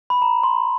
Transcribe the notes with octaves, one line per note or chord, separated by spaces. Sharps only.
B5
A#5
C6